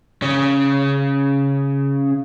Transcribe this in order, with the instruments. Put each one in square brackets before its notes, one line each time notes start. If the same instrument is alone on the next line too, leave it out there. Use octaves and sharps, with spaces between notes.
[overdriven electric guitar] C#3 C#4